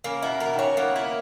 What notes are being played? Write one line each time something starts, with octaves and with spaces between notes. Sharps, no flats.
C#3 A#3
B2 E4
B2 A#4
D#3
C#3 C#5
A#3 B3
E4